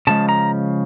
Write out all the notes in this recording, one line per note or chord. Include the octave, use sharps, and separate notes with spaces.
C#3 F3 G#3 A5
A#5